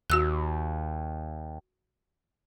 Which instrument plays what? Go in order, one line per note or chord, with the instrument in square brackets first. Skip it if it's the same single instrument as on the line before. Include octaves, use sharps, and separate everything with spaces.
[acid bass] D#2 [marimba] F#4 E6 F#6